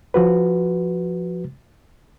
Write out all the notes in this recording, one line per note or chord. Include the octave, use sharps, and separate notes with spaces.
F3 F#4 B4